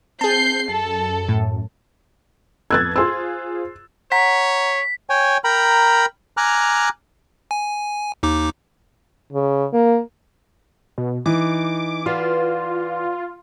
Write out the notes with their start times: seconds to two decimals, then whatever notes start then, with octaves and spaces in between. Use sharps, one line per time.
0.21 C4 G#4 A5 G6 C7
0.69 F#2 A4
1.29 A2
2.71 F2 B3 E6 F#6 G#6 A6
2.96 F4 G#4 C5 C6 E6
4.12 C#5 F#5 A#5 B6
5.10 C#5 G5 G#5
5.44 A#4 G5 A#5 B5
6.37 G#5 A#5 D6 F6 F#6
7.51 G#5
8.23 D#2 D#4 D6
9.33 C#3
9.73 A#3
10.98 B2
11.26 E3 D#4 D6
12.06 F4 F#4 B4 D5